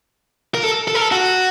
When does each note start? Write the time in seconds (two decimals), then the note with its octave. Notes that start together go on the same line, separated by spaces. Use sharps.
0.55 A#4
0.64 A4
0.88 A4
0.94 A#4
1.01 A4
1.12 F#4